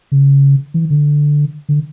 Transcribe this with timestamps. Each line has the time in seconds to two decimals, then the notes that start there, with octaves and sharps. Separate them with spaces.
0.12 C#3
0.74 E3
0.90 D3
1.69 D3